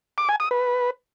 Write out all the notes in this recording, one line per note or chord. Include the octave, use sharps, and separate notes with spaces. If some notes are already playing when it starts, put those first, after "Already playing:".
D6
G#5
D#6
B4